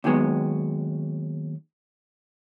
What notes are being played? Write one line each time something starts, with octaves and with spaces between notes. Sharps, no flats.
D#2 D#3 F#3 G#3 B3